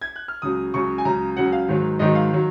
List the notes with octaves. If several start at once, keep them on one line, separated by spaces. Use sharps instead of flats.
G#6
F#6
F6
C#2 C#3 F#3 D#6
C#2 C#3 F#3 C#6
G#5
C#2 C#3 F#3 A#5
C#2 C#3 F#3 F#5
F5
G#2 D#3 F#3
G#2 D#3 F#3 D#5
F5
D#3 F#3